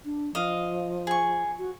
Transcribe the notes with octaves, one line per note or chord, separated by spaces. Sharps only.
D4
F3 D#5 F5
G#4 C#6
F#4